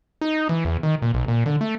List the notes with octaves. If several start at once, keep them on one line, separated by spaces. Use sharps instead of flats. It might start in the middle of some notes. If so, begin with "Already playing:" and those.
D#4
E3
E2
D#3
A#2
B1
A#2
D3
A3